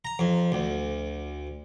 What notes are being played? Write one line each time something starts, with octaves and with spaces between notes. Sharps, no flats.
A#5
F2
D2